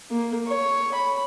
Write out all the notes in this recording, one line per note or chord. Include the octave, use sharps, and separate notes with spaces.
A#3
C#5
B5